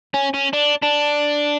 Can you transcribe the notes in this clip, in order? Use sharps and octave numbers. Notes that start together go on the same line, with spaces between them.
C#4
C#4
D4
D4